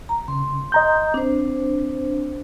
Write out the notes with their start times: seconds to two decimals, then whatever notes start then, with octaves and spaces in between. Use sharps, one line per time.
0.09 A#5
0.28 C#3 C6
0.72 D#5 A#5 G6
1.14 C4 D4 C5